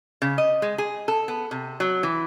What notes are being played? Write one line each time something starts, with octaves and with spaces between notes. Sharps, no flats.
C#3
D#5
G#3
G#4
A4
B3
C3
F#3
E3